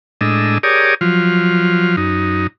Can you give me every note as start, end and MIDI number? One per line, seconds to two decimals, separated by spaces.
0.21 0.58 45
0.21 0.58 56
0.21 0.58 62
0.21 0.58 75
0.21 0.58 88
0.63 0.94 67
0.63 0.94 68
0.63 0.94 70
0.63 0.94 73
0.63 0.94 74
0.63 0.94 87
1.01 1.96 53
1.01 1.96 54
1.01 1.96 65
1.97 2.47 42
1.97 2.47 63